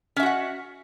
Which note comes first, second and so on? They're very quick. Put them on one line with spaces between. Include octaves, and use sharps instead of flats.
C#4 E5 F#4 F#5